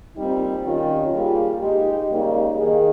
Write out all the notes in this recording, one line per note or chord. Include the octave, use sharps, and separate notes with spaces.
A#2 G3 C4 D#4
D#3 G3 C#4 F4
G3 A#3 F4 G#4
G#3 D#4 G4
C#3 G3 A#3 D#4
D#3 A#3 D#4 G#4